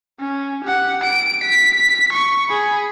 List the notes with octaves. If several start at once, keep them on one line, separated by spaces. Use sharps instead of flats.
C#4
G4 F#5
D7
B6
C#6
G#4 B5